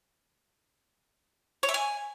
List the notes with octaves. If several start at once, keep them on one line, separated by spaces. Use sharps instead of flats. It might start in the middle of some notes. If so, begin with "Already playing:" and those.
C#5
E5
G#5